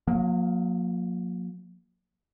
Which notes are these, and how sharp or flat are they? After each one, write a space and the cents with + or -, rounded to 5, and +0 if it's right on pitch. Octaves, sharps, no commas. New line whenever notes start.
F#3 -45 A#3 +0